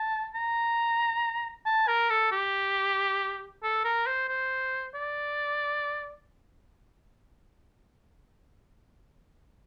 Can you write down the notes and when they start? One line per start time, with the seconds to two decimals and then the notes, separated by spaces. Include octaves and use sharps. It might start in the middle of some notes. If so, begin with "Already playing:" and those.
Already playing: A5
0.34 A#5
1.66 A5
1.88 A#4
2.10 A4
2.31 G4
3.63 A4
3.85 A#4
4.06 C5
4.28 C5
4.95 D5